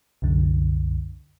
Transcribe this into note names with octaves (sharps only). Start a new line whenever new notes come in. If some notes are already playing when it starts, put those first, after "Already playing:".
C2 F#2 D3